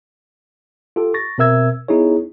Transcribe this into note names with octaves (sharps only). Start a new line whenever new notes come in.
F4 G4 A4
C#6 A6 A#6
B2 C4 A#4 E5 E6 G#6
B3 D#4 E4 G#4 C#5